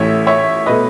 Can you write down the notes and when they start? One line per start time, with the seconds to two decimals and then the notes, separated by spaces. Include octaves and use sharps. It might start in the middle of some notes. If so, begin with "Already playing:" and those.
Already playing: A1 A2 E3 A3 C#5 E5
0.27 C#5 E5
0.66 B2 A3 B4 D#5